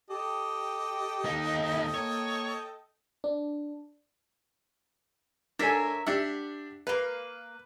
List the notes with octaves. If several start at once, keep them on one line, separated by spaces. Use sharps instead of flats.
G4 A4 D#5 G5
D#2 D#4
A#3 C#5
D4
D4 A4 A#4 C#5 E5 G#5
D4 G4 E5 F#5
A#3 B4 F5